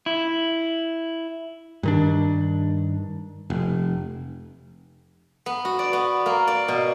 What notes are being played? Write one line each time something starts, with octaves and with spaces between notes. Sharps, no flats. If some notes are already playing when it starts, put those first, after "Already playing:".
E4
G2 D#3 D4
F1
B3
F#4
D5
B3
A#3
D5
B2